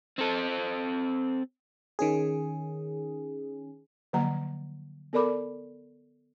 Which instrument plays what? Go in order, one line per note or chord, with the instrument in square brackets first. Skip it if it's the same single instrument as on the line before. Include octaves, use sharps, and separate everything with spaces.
[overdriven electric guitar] C4 A4
[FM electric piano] D#3 C#4 G#4
[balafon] D3 F3 F#3 A#3 F#5 A#5
B3 A4 A#4 D5 B5 D6